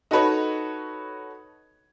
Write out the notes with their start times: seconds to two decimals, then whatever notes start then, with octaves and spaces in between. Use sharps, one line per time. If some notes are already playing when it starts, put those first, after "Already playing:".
0.11 D#4 F#4 A4 B4 C#5 D#5